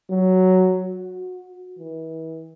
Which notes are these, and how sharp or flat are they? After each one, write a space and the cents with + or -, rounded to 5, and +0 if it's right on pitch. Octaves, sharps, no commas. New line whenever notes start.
F#3 +5
F#4 -20
E3 -35